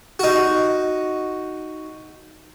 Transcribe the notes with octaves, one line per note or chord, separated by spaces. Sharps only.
D#4 F#4